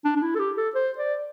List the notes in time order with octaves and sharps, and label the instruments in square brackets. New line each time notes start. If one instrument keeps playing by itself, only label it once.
[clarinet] D4
D4
E4
A4
G4
A4
C5
D5